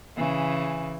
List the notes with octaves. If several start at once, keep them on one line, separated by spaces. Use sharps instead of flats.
C#3 E3